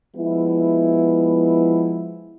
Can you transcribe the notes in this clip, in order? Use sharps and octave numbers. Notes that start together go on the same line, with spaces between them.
F3 G#3 B3 E4